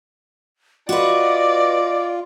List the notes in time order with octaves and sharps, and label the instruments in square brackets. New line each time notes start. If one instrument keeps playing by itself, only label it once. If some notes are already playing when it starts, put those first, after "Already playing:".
[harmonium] F4 [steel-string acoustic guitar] F#4 B4 [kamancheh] D5 [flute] D#5